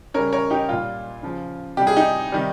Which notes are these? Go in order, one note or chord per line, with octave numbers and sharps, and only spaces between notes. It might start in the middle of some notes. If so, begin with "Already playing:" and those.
C#3 G3 A#4 C#5
A#4 C#5
D#4 G4
A#2 G3 F4
C#3 F3
C3 G3 G4
G#4
D#4 G4
C3 D#3 G3